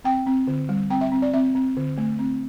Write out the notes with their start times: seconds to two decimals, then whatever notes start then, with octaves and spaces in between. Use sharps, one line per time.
0.04 C4 G5
0.27 C4
0.47 D3
0.69 G3
0.90 C4 G5
1.01 E5
1.12 C4
1.22 D5
1.34 C4 E5
1.55 C4
1.77 D3
1.98 A3
2.19 C4